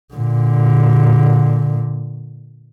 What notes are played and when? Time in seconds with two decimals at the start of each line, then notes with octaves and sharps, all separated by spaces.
0.14 A#2 D3